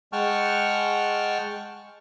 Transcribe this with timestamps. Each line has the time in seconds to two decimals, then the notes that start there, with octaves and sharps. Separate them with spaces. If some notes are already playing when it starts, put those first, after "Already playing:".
0.13 G#3 F#5 G5 A5 C#6 F6